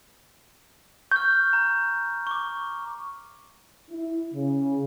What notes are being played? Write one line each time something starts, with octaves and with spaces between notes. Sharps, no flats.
C#6 F6 G6
A#5
C#6 D6
E4
C#3